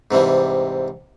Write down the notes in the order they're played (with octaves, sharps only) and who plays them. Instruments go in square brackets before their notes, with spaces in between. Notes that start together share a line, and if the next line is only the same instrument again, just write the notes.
[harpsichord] G#2 C3 E3 G3